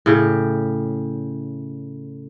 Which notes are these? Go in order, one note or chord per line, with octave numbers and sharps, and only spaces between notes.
A2 C#3 G4